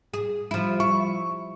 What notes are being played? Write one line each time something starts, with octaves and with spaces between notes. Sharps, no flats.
G#4
F3 G3 E4
E4 C#6